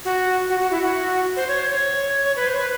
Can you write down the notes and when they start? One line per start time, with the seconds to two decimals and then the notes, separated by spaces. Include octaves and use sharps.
0.05 F#4
0.50 F#4
0.60 F#4
0.71 E4
0.82 F#4
1.37 C5
1.48 C#5
1.59 C5
1.70 C#5
2.25 C#5
2.36 B4
2.47 C5
2.58 B4